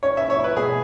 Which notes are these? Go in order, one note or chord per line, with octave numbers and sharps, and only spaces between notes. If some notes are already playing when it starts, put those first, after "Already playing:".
C#4 C#5
E4 E5
C#5
E4 B4
B2 G#4